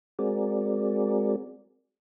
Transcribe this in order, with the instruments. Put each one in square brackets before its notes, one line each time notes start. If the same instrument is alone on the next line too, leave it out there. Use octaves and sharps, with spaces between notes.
[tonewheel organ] G#3 C4 F#4 G#4 A#4 D5